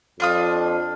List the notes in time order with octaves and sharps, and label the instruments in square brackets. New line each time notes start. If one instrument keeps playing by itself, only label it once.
[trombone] F2 [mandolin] D4 F4 D#6